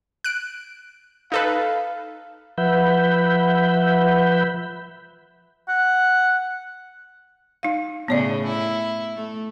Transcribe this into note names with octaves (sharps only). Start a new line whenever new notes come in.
F#6 D7
D#4 A4 B4 F5
F3 B4 E5 F#5 B5 G6
F#5
D#4 F5
A2 C#3 B3 C#5 D5
E4
A3